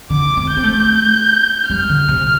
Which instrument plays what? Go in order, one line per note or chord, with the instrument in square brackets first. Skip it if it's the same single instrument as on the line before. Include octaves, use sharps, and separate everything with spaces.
[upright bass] D3 [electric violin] D6
[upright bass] C4
[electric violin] G6
[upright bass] C4
A3
[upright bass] G3 [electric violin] F6
[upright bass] D3
C3